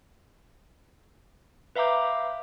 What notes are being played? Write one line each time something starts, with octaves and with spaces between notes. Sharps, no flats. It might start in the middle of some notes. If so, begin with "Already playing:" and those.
B4 E5 F5 A#5 D6 G6